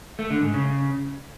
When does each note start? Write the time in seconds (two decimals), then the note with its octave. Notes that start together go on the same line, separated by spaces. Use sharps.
0.19 A3
0.30 D3
0.42 G#2
0.54 C#3